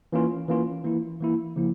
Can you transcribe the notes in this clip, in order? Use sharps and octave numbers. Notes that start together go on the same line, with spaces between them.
E3 A#3 C#4 F4
E3 A#3 C#4 F4
E3 A#3 E4
E3 A#3 E4
C#3 F3 A#3 E4